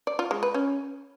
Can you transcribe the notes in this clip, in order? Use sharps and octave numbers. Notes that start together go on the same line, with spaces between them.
D5
F4
G#3
B4
C#4